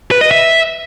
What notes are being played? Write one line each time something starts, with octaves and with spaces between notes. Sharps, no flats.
B4
D#5
E5